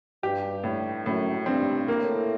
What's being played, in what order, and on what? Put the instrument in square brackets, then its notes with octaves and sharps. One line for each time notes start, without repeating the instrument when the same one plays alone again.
[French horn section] G2 [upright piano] G4
[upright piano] A2
[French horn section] F#2 [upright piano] A2
[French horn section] G2 [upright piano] C4
[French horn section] A2 [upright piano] A#3